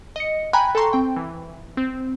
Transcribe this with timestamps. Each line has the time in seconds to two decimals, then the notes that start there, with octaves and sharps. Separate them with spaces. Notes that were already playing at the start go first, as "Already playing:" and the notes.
0.16 D#5 C#7
0.53 G5 G#5 A#5 B5 F#6
0.75 A4 G5 A#5 C6 C#6
0.93 C4 G5
1.16 E3
1.77 C4